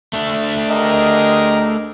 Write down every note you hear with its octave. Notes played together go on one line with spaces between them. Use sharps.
A3 D4
G4 G#4 A#4 D#5